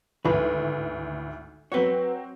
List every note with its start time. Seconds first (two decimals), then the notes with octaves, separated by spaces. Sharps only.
0.25 G#1 D2 A2 B4
1.72 F#3 C4 F#4 B4 C#5